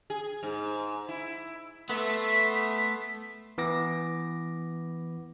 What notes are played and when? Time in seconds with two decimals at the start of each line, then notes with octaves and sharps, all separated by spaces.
0.10 G#4
0.43 G#2
1.09 E4
1.89 A3 B3 E5 C6 B6
3.58 E3 B3 D6 A#6